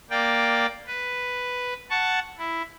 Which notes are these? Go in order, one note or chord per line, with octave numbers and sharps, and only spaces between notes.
A#3 D5 G5
B4
F#5 A5 C#6
E4